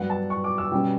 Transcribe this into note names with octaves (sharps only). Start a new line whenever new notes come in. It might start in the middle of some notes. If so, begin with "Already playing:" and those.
Already playing: G2 F#3 B3 D4 F#5
A5
C#6
D6
E6
B2 G3 C#4 G5